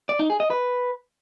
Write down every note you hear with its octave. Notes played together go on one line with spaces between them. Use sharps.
D5
D#4
G#4
D#5
B4